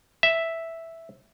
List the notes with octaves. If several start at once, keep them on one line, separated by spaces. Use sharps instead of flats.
E5